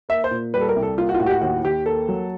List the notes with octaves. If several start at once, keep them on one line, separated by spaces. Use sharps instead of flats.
A#3 E5
C5
A#2
G3 B4
A4
A#4
C2
A4
A#3 F4
F#4
F4
A2 F#4
G4
F#4
D#2 F#4
D#2 G4
A#3 A4
F#3